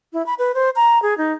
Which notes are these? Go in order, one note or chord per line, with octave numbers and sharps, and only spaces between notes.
E4
B5
B4
C5
A#5
G#4
D#4